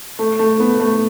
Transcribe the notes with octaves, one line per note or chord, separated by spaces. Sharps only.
A3
A3
B3
A3